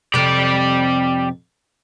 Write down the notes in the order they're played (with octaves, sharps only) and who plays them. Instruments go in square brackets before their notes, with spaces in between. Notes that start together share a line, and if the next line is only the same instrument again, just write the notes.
[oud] F2 C3 [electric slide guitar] G4 D5